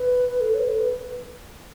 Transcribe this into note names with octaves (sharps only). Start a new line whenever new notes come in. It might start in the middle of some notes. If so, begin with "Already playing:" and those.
Already playing: B4
A4
C#5
B4
A4
B4